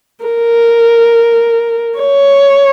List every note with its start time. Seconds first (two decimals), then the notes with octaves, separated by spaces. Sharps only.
0.25 A#4
2.00 C#5